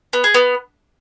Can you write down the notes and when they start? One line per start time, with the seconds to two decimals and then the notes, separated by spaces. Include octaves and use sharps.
0.13 B3
0.24 G#4
0.34 B3